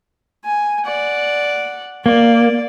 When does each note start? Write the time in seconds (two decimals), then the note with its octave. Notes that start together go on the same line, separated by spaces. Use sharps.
0.45 G#5
0.86 D5 F#5
2.06 A#3 D5